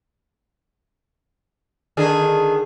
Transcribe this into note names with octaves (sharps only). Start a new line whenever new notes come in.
D3 D#3 G#4